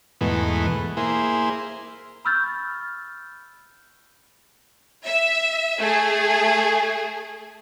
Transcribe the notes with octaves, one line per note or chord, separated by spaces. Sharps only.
E2 G#2 B2 E3 A3 B3
A#3 E4 G#4 C5
B5 C#6 E6 F6 G6 A6
E5
A3 G#4